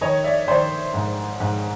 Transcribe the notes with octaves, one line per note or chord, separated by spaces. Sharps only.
D#3 C#5 D#5
D5 E5
D#3 C5 D5
G#2
G#2